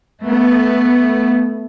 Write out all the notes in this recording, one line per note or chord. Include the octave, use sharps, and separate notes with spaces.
A3 B3